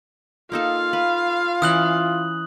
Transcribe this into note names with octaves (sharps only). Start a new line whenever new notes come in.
A#3 D#4 F4 A4 F5
B4
E3 C#4 D#6 F#6 F#7